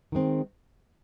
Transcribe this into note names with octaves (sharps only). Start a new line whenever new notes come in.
D#3 G#3 C4